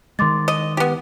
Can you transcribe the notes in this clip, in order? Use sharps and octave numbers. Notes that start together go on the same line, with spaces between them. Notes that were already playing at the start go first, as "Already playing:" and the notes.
D#3 G#3 C6 D6 A6
D#5
B3 G4